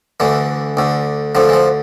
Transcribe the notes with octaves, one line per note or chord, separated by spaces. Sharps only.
D2 D3 E3
D2 D3
D2 D3 F3
E3
F3